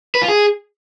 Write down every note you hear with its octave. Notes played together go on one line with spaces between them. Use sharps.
B4
F4
G#4